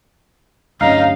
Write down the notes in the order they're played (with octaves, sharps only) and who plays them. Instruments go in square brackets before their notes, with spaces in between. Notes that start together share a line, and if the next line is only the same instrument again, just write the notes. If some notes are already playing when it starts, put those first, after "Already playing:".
[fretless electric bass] D1 G2 C#4 [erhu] D#4 [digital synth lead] F5